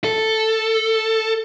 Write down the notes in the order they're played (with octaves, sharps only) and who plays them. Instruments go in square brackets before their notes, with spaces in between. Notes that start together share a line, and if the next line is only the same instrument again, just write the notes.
[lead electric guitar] A4